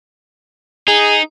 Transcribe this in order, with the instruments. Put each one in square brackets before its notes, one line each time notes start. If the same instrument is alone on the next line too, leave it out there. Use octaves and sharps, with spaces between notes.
[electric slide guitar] D#4 [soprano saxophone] G#4